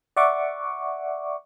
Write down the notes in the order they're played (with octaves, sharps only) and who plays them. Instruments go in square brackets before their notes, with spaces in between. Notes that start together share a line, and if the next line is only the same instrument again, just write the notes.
[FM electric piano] D5 E5 F#5 C#6 D6